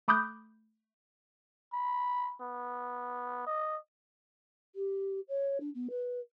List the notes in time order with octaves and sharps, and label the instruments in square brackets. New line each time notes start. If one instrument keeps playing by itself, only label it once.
[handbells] A3 B5 D6 D#6 F#6 G6
[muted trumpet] B5
B3
D#5
[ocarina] G4
C#5
D4
B3
B4